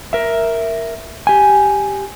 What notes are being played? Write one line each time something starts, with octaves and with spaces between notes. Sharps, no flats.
A#4 E5
G4 G#5